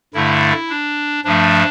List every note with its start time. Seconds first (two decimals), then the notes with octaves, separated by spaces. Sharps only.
0.14 G2 D3 A3 E4
0.69 D4
1.24 G2 F3 A3 D4